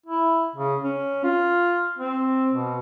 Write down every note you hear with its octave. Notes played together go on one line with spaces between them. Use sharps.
E4
C#3
C#4
F4
C4
B2